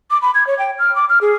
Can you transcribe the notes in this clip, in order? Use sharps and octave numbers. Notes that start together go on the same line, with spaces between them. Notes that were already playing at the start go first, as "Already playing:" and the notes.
D6
B5
G#6
C#5
G5
F6
D6
F6
G#4